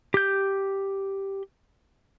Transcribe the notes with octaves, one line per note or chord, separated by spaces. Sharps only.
G4 G6